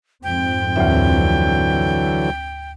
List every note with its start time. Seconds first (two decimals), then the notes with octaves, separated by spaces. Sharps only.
0.23 F2 G#2 C4 G5
0.76 D2 D3 E3 F#3 E5